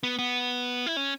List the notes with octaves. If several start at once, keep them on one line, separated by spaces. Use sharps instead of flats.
B3
B3
E4
C#4